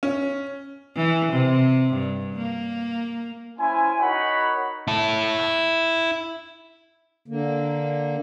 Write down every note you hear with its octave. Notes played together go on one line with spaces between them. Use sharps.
C#4
E3
C3
G2
A#3
C#4 E4 C5 G#5
D#4 F#4 A#4 C#5 F#5 B5
E4 A5
D3 A#3